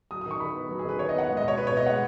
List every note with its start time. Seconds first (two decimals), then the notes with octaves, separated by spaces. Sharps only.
0.11 F#3 D#6
0.21 D#6
0.26 D#3
0.31 C#6
0.40 D#3 B5
0.55 B3
0.69 F#3
0.79 G#4
0.85 D#3 B4
0.99 D#3 C#5
1.09 D#5
1.14 B3 F#5
1.28 G#3
1.37 D#5
1.42 B2
1.48 C#5
1.57 B2 B4
1.67 C#5
1.71 B3
1.77 D#5
1.86 G#3 F#5